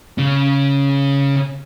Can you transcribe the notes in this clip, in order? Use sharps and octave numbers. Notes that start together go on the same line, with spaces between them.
C#3 C#4